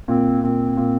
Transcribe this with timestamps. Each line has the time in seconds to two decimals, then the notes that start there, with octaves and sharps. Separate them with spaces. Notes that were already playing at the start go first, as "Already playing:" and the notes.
0.08 A#2 C4
0.43 A#2 C4
0.77 A#2